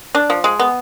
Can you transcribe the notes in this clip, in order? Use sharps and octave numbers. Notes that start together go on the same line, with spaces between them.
D4
F3
G#3
B3